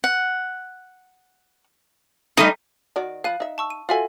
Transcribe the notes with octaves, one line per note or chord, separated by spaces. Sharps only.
F#5
G3 A3 D#4 D#5
D#3 F#4 D5
F3 F5 B5 F#6 D#7
D#4 E5
A5 C#6 E6
D#7
F4 F#4 A4 E5 F5 G#5